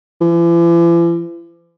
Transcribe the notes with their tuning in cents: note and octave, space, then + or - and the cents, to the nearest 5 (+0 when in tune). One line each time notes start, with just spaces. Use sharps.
E3 +45